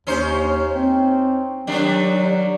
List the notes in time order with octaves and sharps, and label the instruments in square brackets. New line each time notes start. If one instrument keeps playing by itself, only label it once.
[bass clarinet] D#2 [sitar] C#4 D#4 C5
[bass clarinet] C4
[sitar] D#3 G3 D4 [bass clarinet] F#3